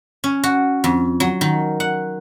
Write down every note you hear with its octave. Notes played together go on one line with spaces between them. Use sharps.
C#4
F#4
F2
F#3
D#3
F#5